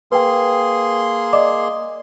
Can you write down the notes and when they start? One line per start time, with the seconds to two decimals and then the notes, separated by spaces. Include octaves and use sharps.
0.12 A#3 G#4 B4 G5 C6
1.33 D5 D#5 D6